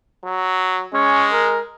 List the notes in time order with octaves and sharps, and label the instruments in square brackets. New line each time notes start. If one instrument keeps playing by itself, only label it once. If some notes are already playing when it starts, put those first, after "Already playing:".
[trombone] F#3
[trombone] G#3 [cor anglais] C#4
[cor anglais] A#4